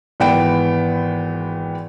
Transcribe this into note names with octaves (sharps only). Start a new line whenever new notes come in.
G#1 E3 B3 G5 D7